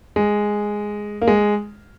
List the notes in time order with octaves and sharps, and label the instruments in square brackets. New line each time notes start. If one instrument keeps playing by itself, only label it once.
[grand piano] G#3
A#3
G#3